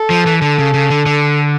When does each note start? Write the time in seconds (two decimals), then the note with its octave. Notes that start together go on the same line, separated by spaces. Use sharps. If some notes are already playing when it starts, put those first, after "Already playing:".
Already playing: A4
0.10 F3
0.26 E3
0.42 D3 A4
0.58 C#3
0.74 C#3
0.90 D3
1.06 D3